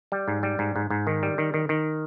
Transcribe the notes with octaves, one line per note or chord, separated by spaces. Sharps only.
G3
G#2
G3
G#2
G#2
G#2
D#3
G3
D#3
D#3
D#3